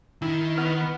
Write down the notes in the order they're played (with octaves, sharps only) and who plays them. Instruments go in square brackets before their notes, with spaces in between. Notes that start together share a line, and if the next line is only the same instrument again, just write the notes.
[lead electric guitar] D#3 [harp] E4
[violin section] B3 [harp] F6